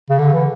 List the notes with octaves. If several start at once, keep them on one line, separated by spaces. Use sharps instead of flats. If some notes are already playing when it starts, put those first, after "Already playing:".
C#3
D3
E3